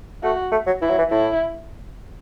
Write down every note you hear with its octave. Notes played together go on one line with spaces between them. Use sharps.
A3 F#4
A3
F#3
E3 E4
F#3
E3
A2 E4